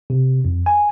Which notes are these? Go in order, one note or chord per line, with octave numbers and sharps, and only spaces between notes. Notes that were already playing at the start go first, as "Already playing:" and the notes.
C3
F2
G#5